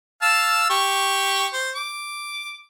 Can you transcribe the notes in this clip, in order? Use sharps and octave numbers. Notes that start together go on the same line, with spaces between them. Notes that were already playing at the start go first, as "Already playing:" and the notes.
F5 A5 E6
G4 C#6
C5
D6